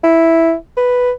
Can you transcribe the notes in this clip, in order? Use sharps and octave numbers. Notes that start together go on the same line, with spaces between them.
E4
B4